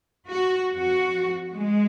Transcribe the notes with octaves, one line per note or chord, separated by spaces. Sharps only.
F#4
F2 F3 F#4
G#3